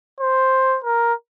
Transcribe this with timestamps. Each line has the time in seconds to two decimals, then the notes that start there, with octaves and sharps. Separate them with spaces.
0.20 C5
0.85 A#4